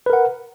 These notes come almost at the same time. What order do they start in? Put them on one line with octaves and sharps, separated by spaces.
B4 A#4 F#5